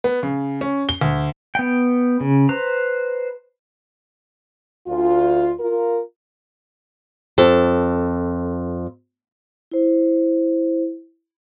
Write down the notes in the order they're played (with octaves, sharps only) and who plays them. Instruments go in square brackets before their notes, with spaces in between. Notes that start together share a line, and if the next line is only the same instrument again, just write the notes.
[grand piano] B3
C#3
C#4
G7
D2
[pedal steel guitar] B3 G5
C#3
B4 C5 A#5
[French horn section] D2 F4
F4 A#4
[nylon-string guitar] F2 A4
[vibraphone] E4 C5